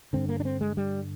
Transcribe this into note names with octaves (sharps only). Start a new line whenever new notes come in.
G2 D3 C4
A#3
D4
C4
G#3
G3